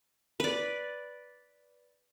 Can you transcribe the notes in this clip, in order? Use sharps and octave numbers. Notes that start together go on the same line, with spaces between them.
B4 D5